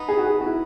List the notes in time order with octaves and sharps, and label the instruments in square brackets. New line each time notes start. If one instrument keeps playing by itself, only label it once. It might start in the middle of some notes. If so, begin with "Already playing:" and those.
Already playing: [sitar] B3 D#4
[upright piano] G#4
F#4
G#4
F#4
E4